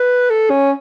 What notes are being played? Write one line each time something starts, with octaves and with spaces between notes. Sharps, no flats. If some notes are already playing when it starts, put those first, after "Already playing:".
Already playing: B4
A4
C#4